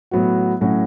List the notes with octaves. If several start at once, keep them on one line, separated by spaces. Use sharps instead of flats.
A2 F#3 B3 F#4
A2 F#3 C#4 F#4